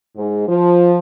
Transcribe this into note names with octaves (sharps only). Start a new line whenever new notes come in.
G#2
F3